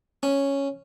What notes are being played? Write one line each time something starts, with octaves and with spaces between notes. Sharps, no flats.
C#4